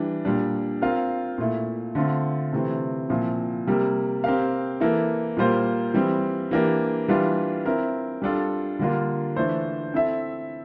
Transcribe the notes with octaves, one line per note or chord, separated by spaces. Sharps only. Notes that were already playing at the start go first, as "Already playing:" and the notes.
Already playing: E3 G3 D4
A#2 G3 D4
C4 F4 A#4 F5
A#2 A3 E4
D3 A3 C4 F4
C3 E3 A3 C4
A#2 F3 C4 E4
C3 G3 A#3
C4 G4 A#4 F5
E3 A#3 E4 A4
A#2 G3 A#3 F4 C5
E3 G3 C4
E3 A#3 D4 G4
E3 G3 D4 F4
C4 E4 A#4
G3 D4 F4 A4
D3 G3 A#3 D4 F4
E3 A3 D4 A4 C5
C4 E4 A4 E5